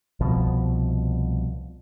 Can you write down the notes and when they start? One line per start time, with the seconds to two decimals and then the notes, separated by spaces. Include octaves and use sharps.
0.20 C2 B2 F3